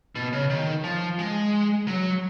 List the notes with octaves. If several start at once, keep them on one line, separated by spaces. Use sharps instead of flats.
B2
C#3
D#3
F3
G#3
F#3